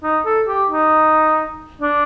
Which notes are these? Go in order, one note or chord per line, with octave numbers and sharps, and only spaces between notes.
D#4
A4
G4
D#4
D4